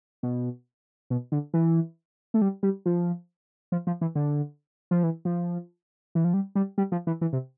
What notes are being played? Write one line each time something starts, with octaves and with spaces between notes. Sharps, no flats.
B2
B2
D3
E3
A3
G3
G3
F3
F3
F3
E3
D3
F3
E3
F3
E3
F3
G3
G3
G3
F3
E3
E3
C3